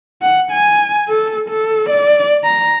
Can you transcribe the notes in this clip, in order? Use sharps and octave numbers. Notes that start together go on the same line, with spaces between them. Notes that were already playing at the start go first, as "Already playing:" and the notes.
F#5
G#5
A4
A4
D5
A#5